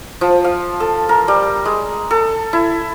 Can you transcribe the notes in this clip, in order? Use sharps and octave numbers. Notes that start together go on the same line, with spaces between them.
F3
F5
A4
A#4
G3
G#3
A4
E4